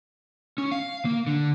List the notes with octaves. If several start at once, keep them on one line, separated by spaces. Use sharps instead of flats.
C#4
F5
A#3
D3